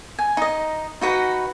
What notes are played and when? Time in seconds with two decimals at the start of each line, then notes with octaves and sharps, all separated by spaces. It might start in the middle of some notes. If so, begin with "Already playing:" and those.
0.19 G#5
0.37 D#4 D#5
1.01 D#4 F#4 B4 F#5